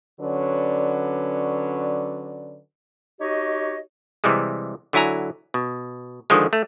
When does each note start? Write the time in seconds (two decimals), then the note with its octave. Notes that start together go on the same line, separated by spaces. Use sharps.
0.21 D3 F#3 C#4 B4 D5
3.20 D#4 F#4 G4 C#5 D#5
4.24 C3 E3 G3 G#3
4.93 D3 F#3 E4 G#5 A#5
5.54 B2
6.30 D3 D#3 F3 G#3
6.53 A3